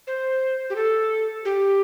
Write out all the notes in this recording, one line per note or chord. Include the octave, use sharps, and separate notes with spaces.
C5
G4
A4
G4